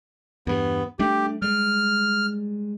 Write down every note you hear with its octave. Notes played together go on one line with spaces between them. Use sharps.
E2 G2 B3
G3 A3 D4 G4
G3 G#3 F6